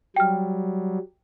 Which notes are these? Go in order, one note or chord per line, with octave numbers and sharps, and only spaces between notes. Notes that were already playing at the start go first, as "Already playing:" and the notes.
F#3 G3 G5 F6